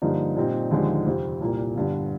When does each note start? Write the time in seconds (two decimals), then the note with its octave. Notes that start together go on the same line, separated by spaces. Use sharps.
0.02 G2 D3 F3 A#3 D#4
0.37 A#2 G3 C4 D#4
0.71 D#2 D3 F3 G#3 D#4
1.06 F2 C3 F3
1.41 C2 A#2 G3 A#3
1.75 G1 G2 D3